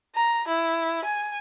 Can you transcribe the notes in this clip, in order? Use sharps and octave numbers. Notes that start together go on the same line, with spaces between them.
A#5
E4
G#5